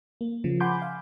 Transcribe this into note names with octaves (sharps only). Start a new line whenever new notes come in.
A#3
C#3 F3
F#5 G#5 B5 C6 D6 G6
F5